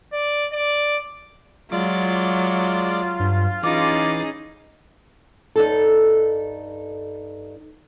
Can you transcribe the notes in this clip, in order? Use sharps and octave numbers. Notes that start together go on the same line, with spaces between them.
D5
D5
F#3 G#3 F4 D5 D6
G2
E3 C#4 D#4 G#4 D6 A6 C7
G2 D#4 A4